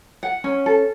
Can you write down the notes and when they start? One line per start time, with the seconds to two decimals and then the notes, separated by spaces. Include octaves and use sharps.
0.23 F#5
0.44 C#4
0.66 A4